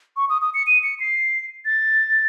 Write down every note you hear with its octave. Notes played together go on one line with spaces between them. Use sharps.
C#6
D#6
D#6
C#7
D#7
C#7
C7
A6